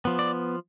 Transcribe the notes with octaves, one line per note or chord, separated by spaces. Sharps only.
F3 B3
D5